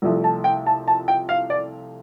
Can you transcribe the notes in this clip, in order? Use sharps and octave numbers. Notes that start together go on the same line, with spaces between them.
C2 C3 F3 A3
A5
G5
A5
A5
G5
F5
D5